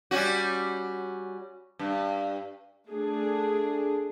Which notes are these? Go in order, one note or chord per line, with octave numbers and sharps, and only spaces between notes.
G3 C#4 F#4
G2
A3 D4 G#4